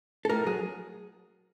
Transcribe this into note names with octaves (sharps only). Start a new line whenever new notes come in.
A4
A2 A#4
F#3 G#4